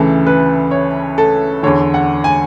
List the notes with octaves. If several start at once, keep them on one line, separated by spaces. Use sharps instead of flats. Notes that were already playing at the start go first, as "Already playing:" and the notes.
Already playing: D2 C#3 E3 A4
B4
C#5
A4
E2 D3 C#5
F#5
G#5